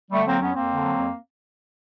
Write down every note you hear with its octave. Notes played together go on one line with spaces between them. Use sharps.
D3 G3 A3
F#3 A#3 C4
F2 B3 C#4
F2 A#3 C4
D3
F#3
F2